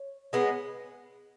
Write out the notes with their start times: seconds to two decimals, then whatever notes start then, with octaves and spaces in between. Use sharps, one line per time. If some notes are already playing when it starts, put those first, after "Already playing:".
Already playing: C#5
0.33 G#3 B3